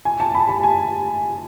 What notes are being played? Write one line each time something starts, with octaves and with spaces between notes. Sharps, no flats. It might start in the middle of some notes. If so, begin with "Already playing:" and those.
G#5
A5
B5
A5
G#5